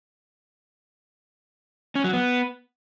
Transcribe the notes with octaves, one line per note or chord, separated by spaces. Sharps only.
C#4
F#3
B3